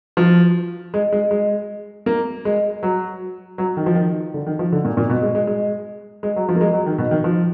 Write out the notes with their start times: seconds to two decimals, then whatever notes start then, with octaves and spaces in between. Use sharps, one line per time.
0.17 F3
0.94 G#3
1.12 G#3
1.31 G#3
2.06 A#3
2.45 G#3
2.83 F#3
3.58 F#3
3.77 D#3
3.86 F3
3.95 D#3
4.34 D3
4.46 D#3
4.59 F3
4.72 D3
4.85 A#2
4.97 A#2
5.09 B2
5.22 G#3
5.35 G#3
5.47 G#3
6.23 G#3
6.36 F#3
6.49 F3
6.56 A#3
6.61 G#3
6.73 F#3
6.86 D#3
6.98 B2
7.11 D#3
7.24 F3